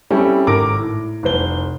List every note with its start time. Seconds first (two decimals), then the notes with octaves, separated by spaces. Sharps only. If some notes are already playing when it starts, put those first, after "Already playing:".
0.10 G3 C4 C#4 E4 G4 A4
0.47 G#1 A4 A#4 D6 A#6 D7
0.79 A2
1.23 F1 C2 C5 G7